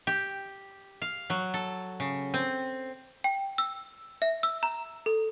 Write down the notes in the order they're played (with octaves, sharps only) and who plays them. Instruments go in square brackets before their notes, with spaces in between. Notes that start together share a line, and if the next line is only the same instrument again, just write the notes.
[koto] G4
F5
F#3
A4
C#3
C4
[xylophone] G5
E6
E5
E6
A#5
A4